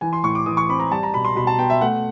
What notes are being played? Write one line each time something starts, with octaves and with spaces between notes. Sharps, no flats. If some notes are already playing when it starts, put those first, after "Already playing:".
E3 G#5
C6
A2 C#6
D6
E3 D#6
C#6
C4 B5
A#5
G3 A5
A#5
B2 B5
C6
B2 B5
A5
B3 G5
E5
A3 F#5